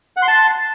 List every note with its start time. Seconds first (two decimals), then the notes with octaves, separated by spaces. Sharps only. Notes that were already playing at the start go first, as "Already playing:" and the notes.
0.17 F#5
0.22 C6
0.28 A5